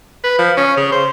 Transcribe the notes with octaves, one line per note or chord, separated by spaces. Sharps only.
B4
F3
C#4
C#3
C5